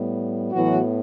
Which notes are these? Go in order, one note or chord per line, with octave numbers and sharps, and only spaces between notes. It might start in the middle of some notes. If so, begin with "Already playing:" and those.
Already playing: A2 G3 B3
A2 E3 F#3 B3 F#4